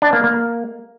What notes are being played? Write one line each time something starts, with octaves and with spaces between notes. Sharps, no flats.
D4
A#3
A#3